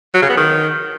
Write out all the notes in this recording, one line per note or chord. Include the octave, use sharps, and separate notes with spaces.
F#3
C#3
B3
D#3